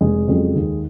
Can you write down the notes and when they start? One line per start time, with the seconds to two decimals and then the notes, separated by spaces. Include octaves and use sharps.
0.01 F1 G#3 G#4
0.28 F2 C#3 F#3
0.55 D#2